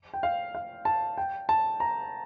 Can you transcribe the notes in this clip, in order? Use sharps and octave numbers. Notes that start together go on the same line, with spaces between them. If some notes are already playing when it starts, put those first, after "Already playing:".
G5
F5
F5
A5
G5
A5
A#5